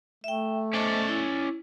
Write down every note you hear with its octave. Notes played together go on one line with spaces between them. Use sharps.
A3 E5 G5
C#4 C5 D5 D#5 A5
E4